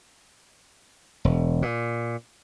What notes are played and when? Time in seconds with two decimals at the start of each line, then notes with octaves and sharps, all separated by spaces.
1.25 E1
1.62 A#2